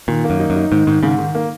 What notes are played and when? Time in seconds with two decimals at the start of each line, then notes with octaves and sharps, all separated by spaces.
0.08 A#2 D#3
0.24 A#3
0.30 F#2
0.40 D#4
0.50 F#2
0.56 D#4
0.72 G#2 D#3
0.87 G#2 D#3
1.03 G#2 C#3
1.19 D#3
1.35 A#3